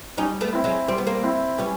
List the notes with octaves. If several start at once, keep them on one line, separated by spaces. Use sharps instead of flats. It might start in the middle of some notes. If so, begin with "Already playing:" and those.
G3 C#4 D#4
A3 B3
C4 E4
F#3 G#3
G3 C4
B3
A#3 C4
C4 E4
G3 B3 C#4